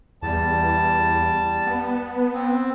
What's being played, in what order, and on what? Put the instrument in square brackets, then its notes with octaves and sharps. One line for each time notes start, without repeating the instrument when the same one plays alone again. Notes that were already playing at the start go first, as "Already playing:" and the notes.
[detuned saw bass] E2 [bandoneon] G3 A5
[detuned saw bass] B3
[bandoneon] C4